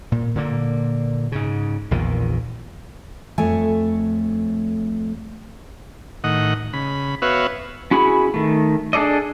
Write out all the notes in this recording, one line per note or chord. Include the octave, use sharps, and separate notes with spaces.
A#2
A#2 D3 A#3
G#2 C#3
A#1 E2 A#2 D#3
F2 A3 C#5 G#5
A2 D#3 D#5 F#5
C#3 B5
B3 F#4 B4 C#5 E5 F5
C#4 E4 F#4 G#4 B5
D#3 A3
D4 G#4 A4 D5 D#5